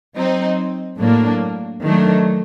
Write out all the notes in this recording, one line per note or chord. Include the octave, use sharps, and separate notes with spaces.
F#3 C4 D#4
A2 F#3 A#3 D4
D#3 F#3 A3 D4